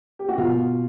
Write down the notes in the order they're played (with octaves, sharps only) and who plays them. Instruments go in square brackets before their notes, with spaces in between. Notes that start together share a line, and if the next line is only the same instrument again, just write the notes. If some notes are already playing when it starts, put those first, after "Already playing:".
[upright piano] G4
F#4
B2 F4